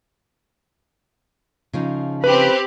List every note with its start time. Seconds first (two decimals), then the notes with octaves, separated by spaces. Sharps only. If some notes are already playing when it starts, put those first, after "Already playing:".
1.73 C#3 F3 D#4
2.24 C4 G4 B4 B5